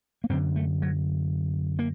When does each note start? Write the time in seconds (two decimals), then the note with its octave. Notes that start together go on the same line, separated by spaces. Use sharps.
0.24 A#3
0.29 F#2 C4
0.32 D3
0.56 A3
0.82 F#3
1.79 A#3